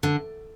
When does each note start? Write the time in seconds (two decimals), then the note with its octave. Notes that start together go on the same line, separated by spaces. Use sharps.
0.03 D3